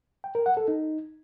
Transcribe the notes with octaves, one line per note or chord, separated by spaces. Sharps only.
G5
A#4
F#5
A4
D#4